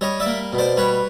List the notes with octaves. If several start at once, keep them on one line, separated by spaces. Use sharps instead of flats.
G3 C#5 D#5
D5 E5
A#3
B2
C5 D5
G3 B4 C#5